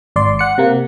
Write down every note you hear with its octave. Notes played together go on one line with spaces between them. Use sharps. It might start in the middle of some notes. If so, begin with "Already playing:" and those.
G#1 D5 C6
F#5 C#7
C3 A#3